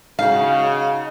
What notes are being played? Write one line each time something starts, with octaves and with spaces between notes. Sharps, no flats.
C#3 D#4 F#4 F5